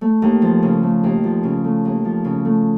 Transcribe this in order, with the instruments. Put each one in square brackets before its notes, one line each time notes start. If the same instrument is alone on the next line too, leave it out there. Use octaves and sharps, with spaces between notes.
[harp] A3
D#2
F3
C#3
A3
D#2
F3
C#3
A3
D#2
F3
C#3
A3